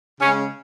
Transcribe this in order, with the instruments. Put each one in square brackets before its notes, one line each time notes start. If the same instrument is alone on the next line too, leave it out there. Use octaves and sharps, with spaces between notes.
[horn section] C#3 G#3 C#4